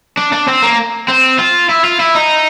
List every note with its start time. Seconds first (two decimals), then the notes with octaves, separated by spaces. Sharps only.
0.17 D4
0.33 D4
0.48 C4
0.62 A#3
1.08 C4
1.39 F4
1.69 E4
1.84 F4
2.00 E4
2.15 D#4